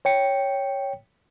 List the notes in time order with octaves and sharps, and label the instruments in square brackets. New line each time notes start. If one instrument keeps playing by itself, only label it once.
[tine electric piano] C#5 G5 C#7